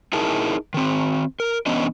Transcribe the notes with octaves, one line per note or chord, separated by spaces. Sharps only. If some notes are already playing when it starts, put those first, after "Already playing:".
D#4 E4 G#4 A#4 A5
D#3 C4
A#4
E3 B3 C#4 D4 D#5